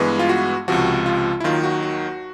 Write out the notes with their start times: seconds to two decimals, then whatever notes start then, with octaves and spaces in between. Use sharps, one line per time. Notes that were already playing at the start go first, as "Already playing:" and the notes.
Already playing: G2 E3 G#3 B3
0.19 F4
0.29 F#4
0.68 C#2 C3 F3 F#4
1.06 F4
1.40 E4
1.44 D#2 D#3 F#3 F4
1.64 F#4
1.83 F#4